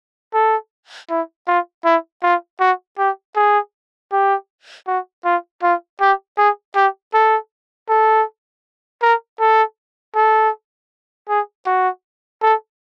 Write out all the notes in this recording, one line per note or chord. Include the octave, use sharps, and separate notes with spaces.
A4
E4
F4
E4
F4
F#4
G4
G#4
G4
F#4
F4
F4
G4
G#4
G4
A4
A4
A#4
A4
A4
G#4
F#4
A4